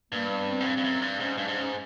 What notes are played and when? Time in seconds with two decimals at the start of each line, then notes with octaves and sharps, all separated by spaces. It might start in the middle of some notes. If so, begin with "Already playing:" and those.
0.12 G2 A#3
0.30 B3
0.48 C4
0.60 G#2
0.66 G2
0.77 G2
0.84 F#2
1.02 G2
1.20 G#2 C#4
1.38 G2 D4
1.48 G#2
1.56 C#4